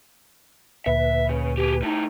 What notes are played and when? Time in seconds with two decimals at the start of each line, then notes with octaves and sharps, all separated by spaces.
0.86 D2 A#2 B4 E5
1.29 C#3
1.58 G4 G#4
1.83 A2 D#4